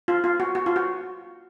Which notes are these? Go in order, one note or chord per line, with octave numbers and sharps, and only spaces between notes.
F4
F4
F#4
F#4
F4
F#4